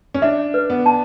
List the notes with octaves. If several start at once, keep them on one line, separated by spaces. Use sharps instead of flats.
C#4
D4 E5
B4
B3
A5